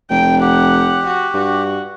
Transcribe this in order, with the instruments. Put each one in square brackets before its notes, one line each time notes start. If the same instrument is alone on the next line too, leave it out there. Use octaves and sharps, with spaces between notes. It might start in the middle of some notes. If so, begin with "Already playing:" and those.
[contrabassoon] F1 [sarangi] G5
[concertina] G4 [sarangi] F#5
[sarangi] F#4
[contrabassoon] G2 [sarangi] F#4